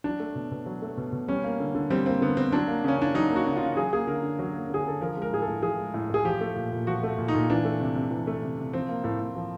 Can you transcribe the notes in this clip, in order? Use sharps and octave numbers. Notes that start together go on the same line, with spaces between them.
F#3 D4
A3
B2
B2
F#3
A3
B2
B2
G3 C#4
A#3
D3
D3
G3 C4
A#3 C4
D3 B3
D3 C4
F#3 D4
A#3
C#3 C#4
C#3 D4
F#3 D#4
A#3
F#4
C#3
F4
C#3
F#3 G#4
A#3 G#4
D3 A#4
D3
F#3
A#3
D3 G#4
D3 A4
F3 A#4
G#3
A#4
A2 G#4
A4
A2
F3 G#4
G#3
A2
A2 G#4
F3 G4
A3
A#2
A#2
F3 F#4
A3
A#2
D#4
A#2
E3 D4
A3
C3
C3
E3
A3
C3
C3
F3 C4
A#3
A2
A2
F3